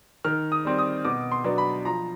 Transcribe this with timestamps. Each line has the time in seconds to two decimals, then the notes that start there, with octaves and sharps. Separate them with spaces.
0.25 D#3 F6
0.52 D#6
0.65 G3 C4
0.78 D#6
1.05 B2 D6
1.32 C6
1.44 F#3 B3 D4
1.58 B5
1.85 F3 A#5